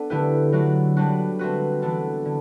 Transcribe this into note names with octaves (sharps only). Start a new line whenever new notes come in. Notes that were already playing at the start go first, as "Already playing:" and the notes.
Already playing: B3 D4 A4
D3 A3 E4 G4 B4
F#3 A3 D4 F#4
D3 G3 B3 D4 F#4
A3 C4 F#4 B4
E3 B3 D4 A4
D3